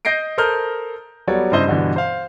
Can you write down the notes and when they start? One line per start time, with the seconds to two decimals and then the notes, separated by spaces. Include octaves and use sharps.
0.05 D#5 G6 A#6 C7 D7
0.38 A4 A#4 C5 D#6 F6 G6
1.28 F#3 G3 B3 A4 C#5 D5
1.52 G2 C#3 E4 C5 D#5 G7
1.67 G2 B2 D3 E3
1.96 C5 F5